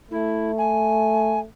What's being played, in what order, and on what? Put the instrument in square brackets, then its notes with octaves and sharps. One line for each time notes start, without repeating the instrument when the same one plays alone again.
[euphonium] A3 [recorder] E4
[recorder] G#5